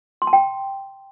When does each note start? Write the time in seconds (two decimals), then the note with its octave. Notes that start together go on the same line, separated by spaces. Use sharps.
0.22 C6
0.27 A5
0.33 G5